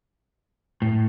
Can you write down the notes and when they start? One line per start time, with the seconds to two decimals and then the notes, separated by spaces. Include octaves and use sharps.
0.82 A2